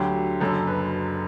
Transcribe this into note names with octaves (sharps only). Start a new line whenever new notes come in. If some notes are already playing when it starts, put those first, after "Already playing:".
Already playing: D2 D3 F#3 G4
F#1 F#2 D3 F#3 A4
B4